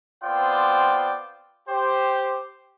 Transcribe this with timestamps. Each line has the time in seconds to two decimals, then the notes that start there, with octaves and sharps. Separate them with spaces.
0.25 B3 C4 F4 C5 D5 G5
1.69 G4 C5